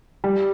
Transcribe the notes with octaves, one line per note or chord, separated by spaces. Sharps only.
G3